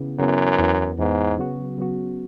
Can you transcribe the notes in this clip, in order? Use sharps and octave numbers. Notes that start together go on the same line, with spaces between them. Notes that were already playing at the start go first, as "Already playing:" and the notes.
Already playing: C#3 E3 B3
F#2 C#3 E3 B3
E2 E3 B3
E2 G#2 E3 B3
C#3 F#3 B3 F#4
C#3 F#3 B3 F#4